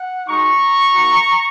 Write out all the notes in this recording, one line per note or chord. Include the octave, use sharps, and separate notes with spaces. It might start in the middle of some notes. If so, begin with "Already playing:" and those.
Already playing: F#5
G#3 D#4 F#4 A#5 C#6
A#3 D#4 F#4